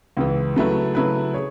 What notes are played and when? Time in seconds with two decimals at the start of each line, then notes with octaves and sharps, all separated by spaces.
0.17 C#2 C#3 E3
0.56 C#3 F#3 A3 E4 B4
0.95 C#3 F#3 A3 E4 B4
1.34 G#4 C#5